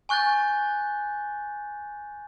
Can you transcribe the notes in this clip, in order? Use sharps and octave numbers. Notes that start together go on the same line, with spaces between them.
G#5 C#6 F#6 G6 A6